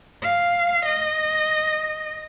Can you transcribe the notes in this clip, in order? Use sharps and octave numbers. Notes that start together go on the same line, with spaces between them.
F5
D#5